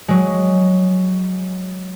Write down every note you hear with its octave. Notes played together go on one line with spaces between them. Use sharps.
F#3 G#3